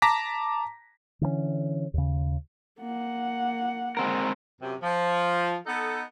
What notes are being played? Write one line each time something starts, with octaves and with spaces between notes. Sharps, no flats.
A5 A#5 D6 A#6 B6
D3 E3 G3 C#4
D#2 C#3
A#3 F#5
G#3 C4 A#4
F#2 C3
F3
B3 D#4 A4